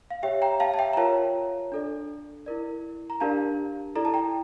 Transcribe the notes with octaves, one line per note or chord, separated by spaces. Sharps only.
F5
G4 C#5 E5 G5
G5 A#5
F5 A5
A5
E5 G5
A#5
F4 A#4 C#5 F5 A5
D4 A4 D5
E4 A#4 D5
A#5
D4 G4 A#4 D5 F5 A5
E4 A4 D5 A#5
A5
G5 A#5